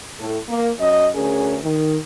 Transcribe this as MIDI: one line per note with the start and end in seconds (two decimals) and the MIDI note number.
0.20 0.37 45
0.20 0.37 69
0.48 0.70 58
0.79 1.08 42
0.79 1.08 75
1.15 1.56 38
1.15 1.56 61
1.15 1.56 68
1.15 1.56 70
1.64 1.96 51